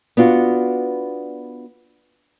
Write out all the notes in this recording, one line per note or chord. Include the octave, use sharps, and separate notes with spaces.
B3 D4 F4 F#4